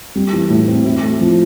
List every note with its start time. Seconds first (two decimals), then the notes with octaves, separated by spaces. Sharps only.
0.15 G3
0.33 E3
0.50 A2
0.68 C4
0.85 E4
1.02 A3
1.21 F3